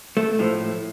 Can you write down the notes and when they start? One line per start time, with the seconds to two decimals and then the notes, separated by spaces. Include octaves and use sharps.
0.17 A3
0.39 A2 F3